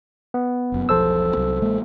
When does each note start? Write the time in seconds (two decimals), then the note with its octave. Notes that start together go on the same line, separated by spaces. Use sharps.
0.34 B3
0.72 F1 F#2
0.89 E1 B1 F3 A4 C5 E6
1.37 C2 F#3
1.62 A1 G#3 A#3